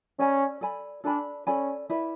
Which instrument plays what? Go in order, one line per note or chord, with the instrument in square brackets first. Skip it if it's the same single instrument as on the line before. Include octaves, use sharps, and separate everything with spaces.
[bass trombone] C#4 [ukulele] A4 D5 G#5 B5
[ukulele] A4 D5 G#5 B5
[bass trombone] D4 [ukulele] A4 D5 G#5 B5
[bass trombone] C#4 [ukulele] A4 D5 G#5 B5
[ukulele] E4 B4 D5